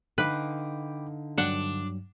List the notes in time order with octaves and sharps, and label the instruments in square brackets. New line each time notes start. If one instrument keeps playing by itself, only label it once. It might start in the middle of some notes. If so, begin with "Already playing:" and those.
[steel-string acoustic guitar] D3 D#4 F5 [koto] B4 [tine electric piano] G5 B5 D6
[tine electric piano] G2 F#3 [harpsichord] D4 [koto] F#5